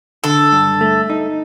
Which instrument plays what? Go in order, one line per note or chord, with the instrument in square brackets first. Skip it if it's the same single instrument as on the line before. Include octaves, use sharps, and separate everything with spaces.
[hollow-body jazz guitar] D3 [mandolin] A4
[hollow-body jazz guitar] G2
A3
D#4